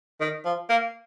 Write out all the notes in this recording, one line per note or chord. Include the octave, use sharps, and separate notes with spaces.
D#3
F3
A#3